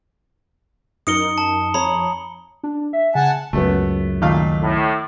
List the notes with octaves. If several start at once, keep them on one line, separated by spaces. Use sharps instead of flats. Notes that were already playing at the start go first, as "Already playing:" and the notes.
F#2 D#4 A#4 D#6 C#7 G7
A5
F2 C#5 A#5 B5
D4
E5
C#3 F#5 G#5 A5
C#2 F#2 A3 B3
A#2 D#3 A3 F5
A2